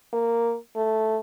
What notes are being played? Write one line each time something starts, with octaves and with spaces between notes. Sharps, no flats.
A#3
A3